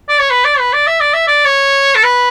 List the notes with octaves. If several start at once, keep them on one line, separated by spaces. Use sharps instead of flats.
D5
C#5
B4
D5
B4
D5
E5
D5
E5
D5
C#5
A4
B4